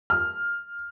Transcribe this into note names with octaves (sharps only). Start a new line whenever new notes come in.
F6